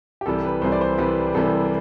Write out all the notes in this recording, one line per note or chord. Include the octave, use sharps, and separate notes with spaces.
G4
C2 C3 E3 G3 A4
B4
C2 C3 E3 G3 C5
D5
C5
C2 C3 E3 G3 B4
C2 C3 E3 G3 A4